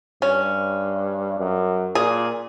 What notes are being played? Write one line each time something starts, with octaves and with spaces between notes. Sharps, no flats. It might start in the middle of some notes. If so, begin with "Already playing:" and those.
G2 C#4
F#2
A#2 G#4